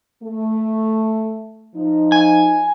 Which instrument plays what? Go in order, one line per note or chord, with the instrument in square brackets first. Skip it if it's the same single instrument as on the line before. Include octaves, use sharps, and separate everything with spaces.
[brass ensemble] A3
F3 D#4
[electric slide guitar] G#5